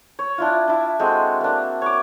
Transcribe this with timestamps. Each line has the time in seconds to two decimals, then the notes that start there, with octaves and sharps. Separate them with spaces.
0.19 C#5
0.38 D4 E4 F4
0.68 D4 E4
0.99 G#3 C4 F#4 A4
1.41 A#3 D4
1.82 C#5 D6